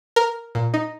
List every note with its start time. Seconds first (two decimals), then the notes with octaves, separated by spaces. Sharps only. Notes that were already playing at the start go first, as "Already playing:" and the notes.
0.16 A#4
0.55 A#2
0.74 D#4